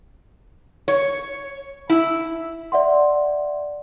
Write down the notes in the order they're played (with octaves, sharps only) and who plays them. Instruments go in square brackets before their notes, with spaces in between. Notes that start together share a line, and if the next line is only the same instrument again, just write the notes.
[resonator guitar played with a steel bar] C#5
E4
[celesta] D5 E5 F#5 C6